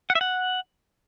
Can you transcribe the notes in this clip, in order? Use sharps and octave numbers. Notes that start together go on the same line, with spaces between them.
F#5
E5
F#5